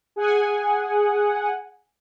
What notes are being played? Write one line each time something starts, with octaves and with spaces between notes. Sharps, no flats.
G#4 F#5 G#5